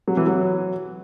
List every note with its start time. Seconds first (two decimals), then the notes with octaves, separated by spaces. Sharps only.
0.08 F#3
0.17 E3
0.27 F#3